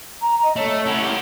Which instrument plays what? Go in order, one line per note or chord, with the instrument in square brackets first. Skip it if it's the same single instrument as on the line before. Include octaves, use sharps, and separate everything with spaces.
[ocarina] A#5
D#5
[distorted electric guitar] A3 [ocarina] C#5
[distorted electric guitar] C#4 E4 [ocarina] F#5
[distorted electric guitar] G4 A#4